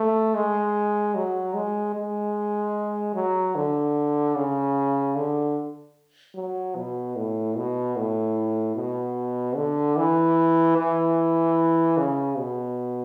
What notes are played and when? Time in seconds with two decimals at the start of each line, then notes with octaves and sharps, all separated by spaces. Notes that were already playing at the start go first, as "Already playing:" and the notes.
Already playing: A3
0.35 G#3
1.15 F#3
1.54 G#3
1.95 G#3
3.14 F#3
3.55 D3
4.36 C#3
5.16 D3
6.35 F#3
6.76 B2
7.16 A2
7.56 B2
7.96 A2
8.76 B2
9.56 D3
9.96 E3
10.77 E3
11.97 C#3
12.37 B2